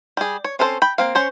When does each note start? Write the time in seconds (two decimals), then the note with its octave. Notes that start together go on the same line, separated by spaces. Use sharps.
0.17 G3 G#4
0.44 C#5
0.59 C4 C#4 A4 B4 C5
0.82 G5 B5
0.98 A#3 C4 F5
1.15 C#4 C5 C#5